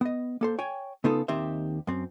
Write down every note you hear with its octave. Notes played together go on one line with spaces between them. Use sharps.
B3 D#5
A#3 A4 C5
C#5 G5 G#5
C#3 B3 D#4 F4 A4
D#2 D#3 C4 G4 C5 E5
F#2 C4